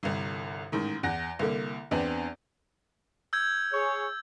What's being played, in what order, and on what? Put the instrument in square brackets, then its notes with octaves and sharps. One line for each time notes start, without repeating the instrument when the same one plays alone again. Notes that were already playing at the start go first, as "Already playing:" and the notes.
[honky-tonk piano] G1 C2
A1 G#2 D#3
E2 F#5 A#6
C2 D3 A#3
E2 B3 C4 D4
[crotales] E6 G6 G#6
[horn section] G#4 C#5